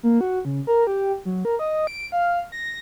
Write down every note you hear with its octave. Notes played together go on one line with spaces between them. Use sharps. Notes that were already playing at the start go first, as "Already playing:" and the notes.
A#3
F#4
C#3
A#4
G4
F#3
A#4
D#5
D7
F5
A#6